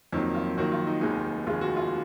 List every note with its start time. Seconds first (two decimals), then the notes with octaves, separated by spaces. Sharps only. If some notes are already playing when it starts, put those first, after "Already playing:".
0.12 F2 D#3 F#3 A#3 D#4
0.35 F4
0.57 F2 D#3 F#3 A#3 F#4
0.72 F4
0.87 D#4
1.01 F1 D#2 D#3 G#3 D#4
1.46 F1 D#2 D#3 G#3 F4
1.61 F#4
1.77 F4